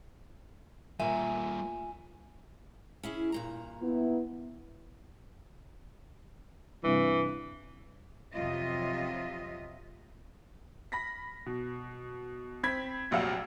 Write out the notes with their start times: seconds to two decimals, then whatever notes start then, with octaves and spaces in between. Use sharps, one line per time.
1.00 A#2 G3 A#3 E5 G#5
3.03 C#4 E4 G#4
3.32 G2 A#2 A#5
3.82 B3 E4
6.84 G2 C3 E3
8.35 F2 C3 F#3 F4 D#5 E5
10.92 B5 A#6 B6
11.46 B2
12.63 C4 B5 G#6 B6
13.11 F1 A#1 F#3 F5 F#5 E6